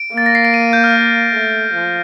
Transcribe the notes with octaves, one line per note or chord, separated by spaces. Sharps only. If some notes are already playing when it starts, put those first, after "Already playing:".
Already playing: D7
A#3 A6
A#6
C7
D7
D#7
G6
F6
A3
F3